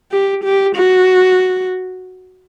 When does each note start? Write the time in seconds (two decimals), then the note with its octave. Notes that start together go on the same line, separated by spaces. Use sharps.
0.12 G4
0.44 G4
0.76 F#4